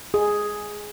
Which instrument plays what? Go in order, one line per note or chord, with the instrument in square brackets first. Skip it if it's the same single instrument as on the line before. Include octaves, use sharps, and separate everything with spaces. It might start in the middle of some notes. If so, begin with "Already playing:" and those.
[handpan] G#4